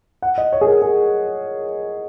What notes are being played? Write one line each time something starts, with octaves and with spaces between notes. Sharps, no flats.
F#5
D#5
C#5
G#4
A#4
G#4